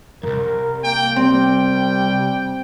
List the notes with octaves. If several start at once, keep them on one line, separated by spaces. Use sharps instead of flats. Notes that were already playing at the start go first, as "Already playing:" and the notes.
C2 F2 A#4
A#3 G5
G3 C4 G5